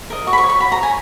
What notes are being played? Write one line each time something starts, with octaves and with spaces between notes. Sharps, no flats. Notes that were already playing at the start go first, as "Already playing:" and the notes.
A#4 D#5
F#4 C#6
B5
C#6
C#5
C#6
F#4 B5
A#5
C#5
G#5